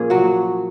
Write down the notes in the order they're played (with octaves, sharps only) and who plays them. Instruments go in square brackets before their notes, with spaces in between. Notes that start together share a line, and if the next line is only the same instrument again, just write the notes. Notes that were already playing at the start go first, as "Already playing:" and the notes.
Already playing: [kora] A#2 F3 A#3 C#4 G#4
F#3 F#4